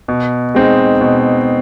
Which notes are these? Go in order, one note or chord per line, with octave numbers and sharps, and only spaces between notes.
B2
G#3 C4 D#4
B2